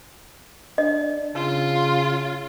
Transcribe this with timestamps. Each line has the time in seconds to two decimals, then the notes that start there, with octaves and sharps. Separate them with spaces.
0.78 D4 D#5
1.35 C#3 F4